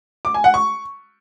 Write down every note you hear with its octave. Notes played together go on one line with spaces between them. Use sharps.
D6
G#5
F#5
C#6